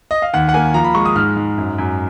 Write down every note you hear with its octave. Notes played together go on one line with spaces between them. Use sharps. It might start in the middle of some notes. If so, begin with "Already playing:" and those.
D#5
F5
D#2 F#5
F#5
A#3 G#5
F3 A#5
B5
G#3 C#6
D#6
G#2 F6
G#2
F#2
F#2